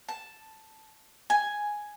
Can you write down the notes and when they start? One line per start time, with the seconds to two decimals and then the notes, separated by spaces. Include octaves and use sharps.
0.09 A5
1.30 G#5